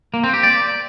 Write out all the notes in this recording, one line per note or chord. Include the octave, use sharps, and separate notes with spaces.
A#3
C4
G4
D5